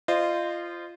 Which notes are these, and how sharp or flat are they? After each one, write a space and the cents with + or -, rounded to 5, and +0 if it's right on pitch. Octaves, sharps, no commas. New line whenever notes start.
F4 -20 C5 +0 D#5 -30